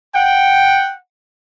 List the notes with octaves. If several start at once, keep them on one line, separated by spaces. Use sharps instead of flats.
F#5 G5